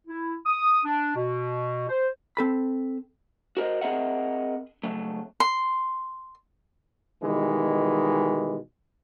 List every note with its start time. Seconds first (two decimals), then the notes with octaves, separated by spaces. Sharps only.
0.08 E4
0.46 D#6
0.85 D4
1.16 B2
1.89 C5
2.37 C4 A4 B5
3.57 F#4 A#4 C5 D#5
3.81 C4 G#4 A#4 D#5 E5 F#5
4.84 C#3 F#3 A3
5.40 C6
7.22 B2 D#3 E3 G3 G#3